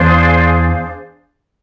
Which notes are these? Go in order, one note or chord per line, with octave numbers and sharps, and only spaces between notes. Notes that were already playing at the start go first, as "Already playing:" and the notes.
Already playing: E2 D4 G#4 C5 F5